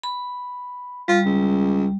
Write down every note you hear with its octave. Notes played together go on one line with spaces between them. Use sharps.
B5
G3 F4
C#2